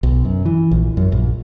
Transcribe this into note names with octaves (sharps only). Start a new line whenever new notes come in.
B1
F#2
E3
A#1
F#2
A#1